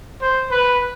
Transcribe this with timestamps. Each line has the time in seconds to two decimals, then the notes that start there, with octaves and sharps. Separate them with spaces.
0.21 C5
0.50 B4